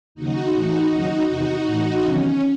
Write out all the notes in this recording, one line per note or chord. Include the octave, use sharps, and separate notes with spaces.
D#2 C#3 F#3 D#4 F#4
A2 E3 D#4 F#4
D#2 C#3 F#3 D#4 F#4
E2 C3 D#3 D#4 F#4
A2 E3
E2 C3 D#3 F#3 C#4